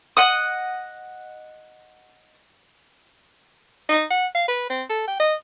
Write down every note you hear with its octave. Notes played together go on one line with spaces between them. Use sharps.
D#5 F#5 D#6
D#4
F#5
F5
B4
C4
A4
G5
D#5